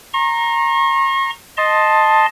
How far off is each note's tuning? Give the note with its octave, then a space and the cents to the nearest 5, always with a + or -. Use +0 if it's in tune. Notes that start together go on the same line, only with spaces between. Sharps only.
A#5 +0 C#6 -45
D#5 +0 A5 +0 C6 +10